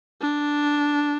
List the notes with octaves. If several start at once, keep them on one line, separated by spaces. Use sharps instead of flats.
D4